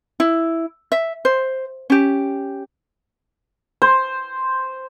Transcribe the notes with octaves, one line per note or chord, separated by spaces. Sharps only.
E4
E5
C5
C#4 G4
C5